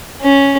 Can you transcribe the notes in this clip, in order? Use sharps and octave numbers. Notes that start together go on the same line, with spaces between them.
C#4